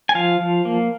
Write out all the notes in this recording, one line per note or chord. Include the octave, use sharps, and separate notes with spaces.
G#5
F3 F5
F3
A#3